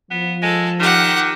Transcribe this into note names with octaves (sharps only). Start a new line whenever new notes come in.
F3 B3
G#3 A4
D#3 G4 F#5